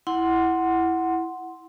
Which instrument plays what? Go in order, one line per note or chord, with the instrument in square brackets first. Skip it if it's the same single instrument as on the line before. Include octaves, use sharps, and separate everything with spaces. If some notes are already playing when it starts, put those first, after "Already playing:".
[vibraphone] E4 F#5 C6